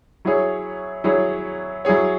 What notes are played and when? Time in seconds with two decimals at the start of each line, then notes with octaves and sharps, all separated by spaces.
0.25 F#3 E4 G#4 C#5
1.04 F#3 E4 G#4 C#5
1.85 F#3 E4 G#4 C#5